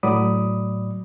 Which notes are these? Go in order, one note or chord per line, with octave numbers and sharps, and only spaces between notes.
A2 F#3 D5 B5 D6 D#6